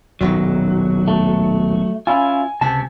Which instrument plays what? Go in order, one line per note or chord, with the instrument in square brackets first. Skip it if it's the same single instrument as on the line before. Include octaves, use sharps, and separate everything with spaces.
[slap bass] D#1 B1 D#3 [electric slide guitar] F#3 F#4
[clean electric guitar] A3
[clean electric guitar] C#4 E4 F4 [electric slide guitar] G#5
[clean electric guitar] C#2 A5 [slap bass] C3